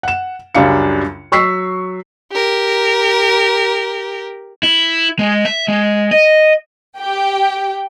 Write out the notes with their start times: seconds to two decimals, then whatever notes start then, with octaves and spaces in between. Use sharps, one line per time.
0.03 F#5 E7
0.55 C#2 F#2 G3 D4 F5 C#7
1.32 F#3 C#6 E6 B6 C7
2.32 G4 A#4
4.63 E4
5.19 G#3
5.45 E5
5.68 G#3
6.11 D#5
6.97 G4 G5